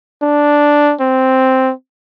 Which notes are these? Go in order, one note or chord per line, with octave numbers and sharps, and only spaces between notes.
D4
C4